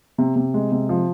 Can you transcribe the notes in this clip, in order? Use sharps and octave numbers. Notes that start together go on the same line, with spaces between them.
C3
C3
G#3
C3
F3